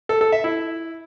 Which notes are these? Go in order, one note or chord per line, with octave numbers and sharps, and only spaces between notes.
A4
A4
E5
E4